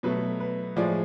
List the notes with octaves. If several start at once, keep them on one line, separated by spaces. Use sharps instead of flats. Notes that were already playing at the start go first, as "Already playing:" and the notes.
B2 F#3 A3 B4
B4
A2 F3 G#3 D5